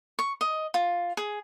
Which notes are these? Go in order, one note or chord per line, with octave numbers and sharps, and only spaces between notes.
C#6
D#5
F4
G#4